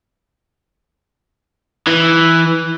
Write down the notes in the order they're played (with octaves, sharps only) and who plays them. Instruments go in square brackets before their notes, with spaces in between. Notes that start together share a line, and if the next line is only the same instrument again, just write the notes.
[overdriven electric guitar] E3